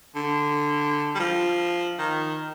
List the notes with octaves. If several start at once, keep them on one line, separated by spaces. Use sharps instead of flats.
D3
G3
F3
D#3